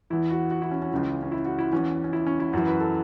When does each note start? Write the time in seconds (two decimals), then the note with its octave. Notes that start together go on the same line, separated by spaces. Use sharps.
0.10 E2 E3 E4
0.31 F#4
0.51 F#4
0.62 E4
0.71 C#4
0.82 C#4
0.92 C#2 C#3 E3
1.22 C#4
1.32 E4
1.45 F#4
1.59 E4
1.72 E2 E3 C#4
2.04 C#4
2.13 E4
2.26 C#4
2.40 E4
2.53 F#2 E3 F#4
2.67 B4
2.80 A4